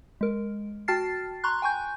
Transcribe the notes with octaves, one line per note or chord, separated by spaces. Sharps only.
G#3 A#4
F#4 G5 A5 F6 A6 C7
A#5 C6 C#6 F#6
G5 G#5 C#6 G6